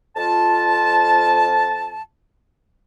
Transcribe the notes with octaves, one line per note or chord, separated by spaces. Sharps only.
F2 F4 A5